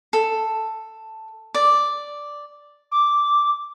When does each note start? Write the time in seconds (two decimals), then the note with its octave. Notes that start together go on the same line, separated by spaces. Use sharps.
0.13 A4
1.55 D5
2.91 D6